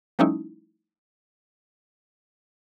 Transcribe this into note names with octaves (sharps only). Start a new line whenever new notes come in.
F3 G3 A3 C#4 D#4 E4